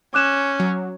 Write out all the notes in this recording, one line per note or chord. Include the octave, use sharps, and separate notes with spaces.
C#4 D6 F#6 E7
F#3